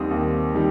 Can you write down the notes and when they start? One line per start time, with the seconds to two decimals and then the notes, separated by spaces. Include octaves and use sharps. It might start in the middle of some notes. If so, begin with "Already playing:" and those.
Already playing: D#2 D#3 G3 C4 D#6
0.11 D#2
0.54 D#3 G3